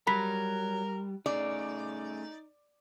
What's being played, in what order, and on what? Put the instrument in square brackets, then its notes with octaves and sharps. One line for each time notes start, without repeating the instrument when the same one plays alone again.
[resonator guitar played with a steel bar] F#3 [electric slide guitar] G3 [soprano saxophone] A#4 [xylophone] B5 B6
[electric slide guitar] A3 C#4 G#4 [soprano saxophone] D#4 [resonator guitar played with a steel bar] D5